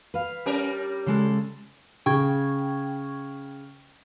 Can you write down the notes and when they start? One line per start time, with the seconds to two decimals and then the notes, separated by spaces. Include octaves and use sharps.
0.14 B4 F5
0.46 G3 C#4 A#4
1.06 C#3 G#3 A4
2.06 C#3 G5 C#6 G#6